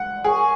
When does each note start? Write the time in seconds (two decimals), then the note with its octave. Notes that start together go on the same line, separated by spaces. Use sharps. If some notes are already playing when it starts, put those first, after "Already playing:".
Already playing: F#5
0.24 G#4 A#4 C#5 G#5 C#6